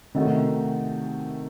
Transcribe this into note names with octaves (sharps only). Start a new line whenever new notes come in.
C3 D#3 A3 D#4 F#4